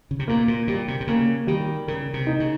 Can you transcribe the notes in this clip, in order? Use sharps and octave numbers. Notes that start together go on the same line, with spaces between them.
C#3
C3
A#2 A#3
A#2
A#2 G3
C3
C3
C#3 A#3
D#3 G3
C#3 A#4
C3
D#4
C#3